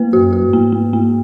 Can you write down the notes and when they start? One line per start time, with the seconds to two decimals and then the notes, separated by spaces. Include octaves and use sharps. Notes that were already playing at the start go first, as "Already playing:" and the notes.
Already playing: A#3 B4
0.13 F#2 F#4
0.33 F#4
0.53 G#2 A#3
0.72 A#3
0.93 A#3